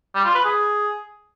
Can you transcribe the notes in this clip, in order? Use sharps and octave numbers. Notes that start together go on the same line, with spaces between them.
G3
F4
B4
G#4